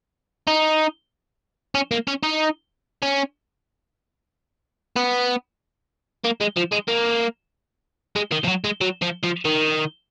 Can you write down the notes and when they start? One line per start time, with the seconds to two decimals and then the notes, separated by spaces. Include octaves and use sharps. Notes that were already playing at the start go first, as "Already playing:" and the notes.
0.47 D#4
1.75 C#4
1.91 A#3
2.07 C#4
2.23 D#4
3.03 C#4
4.96 B3
6.24 A#3
6.41 G#3
6.57 F3
6.72 G#3
6.88 A#3
8.16 G#3
8.32 D#3
8.44 F3
8.48 F#3
8.64 G#3
8.81 F#3
9.02 F3
9.23 F3
9.45 D#3